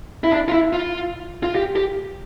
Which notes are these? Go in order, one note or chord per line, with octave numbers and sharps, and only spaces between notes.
E4
D4
F4
E4
F4
F4
G4
G4